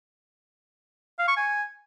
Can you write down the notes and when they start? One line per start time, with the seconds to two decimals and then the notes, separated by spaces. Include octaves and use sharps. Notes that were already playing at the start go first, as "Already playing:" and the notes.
1.19 F5
1.28 C#6
1.37 G#5